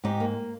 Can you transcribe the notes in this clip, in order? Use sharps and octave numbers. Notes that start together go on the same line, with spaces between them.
G#2 D#4 G4
A#3